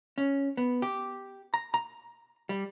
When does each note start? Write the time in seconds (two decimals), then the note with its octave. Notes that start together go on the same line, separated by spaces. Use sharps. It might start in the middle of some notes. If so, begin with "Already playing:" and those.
0.18 C#4
0.57 B3
0.82 G4
1.54 A#5
1.74 A#5
2.49 G3